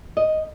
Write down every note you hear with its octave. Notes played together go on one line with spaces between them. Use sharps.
D#5